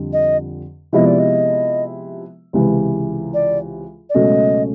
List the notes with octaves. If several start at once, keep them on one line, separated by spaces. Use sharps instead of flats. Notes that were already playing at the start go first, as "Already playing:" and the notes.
Already playing: F2 D3 G3 C4
D#5
C3 F3 G#3 B3 E4 D#5
D5
D#5
C#2 C3 E3
D5
D5
C#2 B2 F#3 A3 C#4 D#5